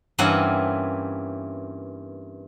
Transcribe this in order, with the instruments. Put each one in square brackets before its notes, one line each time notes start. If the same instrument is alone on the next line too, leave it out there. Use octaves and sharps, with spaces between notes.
[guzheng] G2 E3 A#3 C4 C#4 F#5